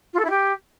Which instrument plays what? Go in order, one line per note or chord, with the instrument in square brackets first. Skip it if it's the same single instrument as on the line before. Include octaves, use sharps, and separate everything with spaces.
[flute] F4
A4
E4
G4